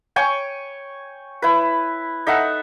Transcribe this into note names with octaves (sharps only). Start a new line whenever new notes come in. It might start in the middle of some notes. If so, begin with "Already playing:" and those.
C#5 G5 G#5 C#6
E4 B4
D#4 A4 E5 F#5